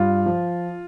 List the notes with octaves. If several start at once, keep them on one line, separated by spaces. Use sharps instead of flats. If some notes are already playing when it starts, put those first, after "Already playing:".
Already playing: G2 F4
F3